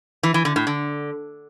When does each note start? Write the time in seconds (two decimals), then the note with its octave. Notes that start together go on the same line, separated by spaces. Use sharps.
0.23 E3
0.34 E3
0.45 D3
0.56 A2
0.67 D3